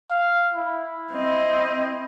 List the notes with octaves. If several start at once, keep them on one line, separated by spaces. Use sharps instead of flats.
F5
E4
C4 D#5